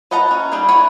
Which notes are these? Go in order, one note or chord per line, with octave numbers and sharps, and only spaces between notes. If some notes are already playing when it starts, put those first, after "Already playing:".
B4 D#5 F#5 A5 A#5
C#4
G3 D#4 E4 G#4
E3 B4 C#5 F#5